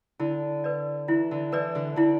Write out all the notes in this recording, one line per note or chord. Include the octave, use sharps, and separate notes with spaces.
D3 E4
B4 D5
E3 E4
D3
E3 B4 D5
D3
D3 E4